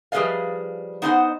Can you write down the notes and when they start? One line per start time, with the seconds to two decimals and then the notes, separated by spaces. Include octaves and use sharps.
0.12 F3 G3 G#4 B4 D#5 F5
1.02 B3 D#4 C5 D#5 E5 F#5